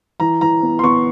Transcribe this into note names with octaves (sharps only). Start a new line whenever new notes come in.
E3 A#5
E3 A#5
B3
C6
B3 C#6